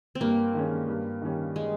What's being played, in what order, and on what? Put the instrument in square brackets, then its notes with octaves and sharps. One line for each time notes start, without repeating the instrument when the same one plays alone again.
[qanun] C4
[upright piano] G2 [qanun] A#3
[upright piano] D#3 G#3 C#4
G2
D#3 G3 C#4
[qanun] G#3